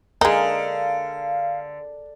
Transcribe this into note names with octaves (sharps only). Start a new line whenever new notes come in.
D3 G#3 D#4 G#4 A#4 F5